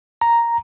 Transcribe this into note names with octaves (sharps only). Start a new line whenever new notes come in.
A#5